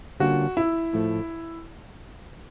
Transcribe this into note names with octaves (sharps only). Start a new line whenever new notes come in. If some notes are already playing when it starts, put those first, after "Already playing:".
D3 G3 A#3 C#4 F4 F#4
E4
A2 F3 A3